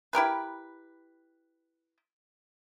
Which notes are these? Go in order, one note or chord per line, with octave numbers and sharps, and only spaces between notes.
E4 G4 A#4 B4